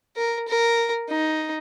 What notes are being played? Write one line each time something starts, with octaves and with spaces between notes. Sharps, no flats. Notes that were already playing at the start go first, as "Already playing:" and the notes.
A#4
A#4
D#4